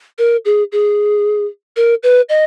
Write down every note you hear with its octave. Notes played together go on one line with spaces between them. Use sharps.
A#4
G#4
G#4
A#4
B4
D#5